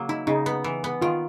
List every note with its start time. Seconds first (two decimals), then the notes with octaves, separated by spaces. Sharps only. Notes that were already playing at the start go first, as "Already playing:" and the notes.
Already playing: C#3 F#3 A#3
0.09 D#4 E4
0.27 C#3 D#4
0.46 B3
0.64 E3
0.84 B3
1.02 D#3 F4